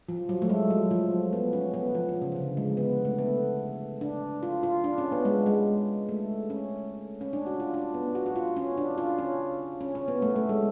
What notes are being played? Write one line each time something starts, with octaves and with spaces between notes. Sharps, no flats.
F3
F#3
A3
G#3
F#3
F3
B3
C#4
B3
F3
F3
C#3
C#3
D3
G#3
B3
A3
B3
D4
F4
F4
D4
C#4
B3
G#3
G#3
A3
C#4
C#4
D4
F#4
F4
D4
B3
F#4
F#4
F4
C#4
D4
F4
C#4
C#4
C#4
B3
A3
A3
G#3